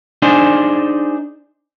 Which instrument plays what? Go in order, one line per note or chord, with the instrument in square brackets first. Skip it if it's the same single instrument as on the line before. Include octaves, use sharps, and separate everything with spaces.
[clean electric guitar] D4 D#4 G#4 C5